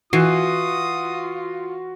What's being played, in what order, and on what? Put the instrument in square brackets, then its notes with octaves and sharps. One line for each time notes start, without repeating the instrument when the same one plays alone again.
[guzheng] E3 [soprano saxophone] F4 [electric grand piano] F#4 C7 [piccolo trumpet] D#6